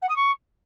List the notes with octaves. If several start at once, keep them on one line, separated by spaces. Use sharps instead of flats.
F#5
D#6
C#6